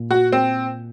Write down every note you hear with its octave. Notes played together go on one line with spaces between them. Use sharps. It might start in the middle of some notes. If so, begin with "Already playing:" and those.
Already playing: A#2
F#4
C4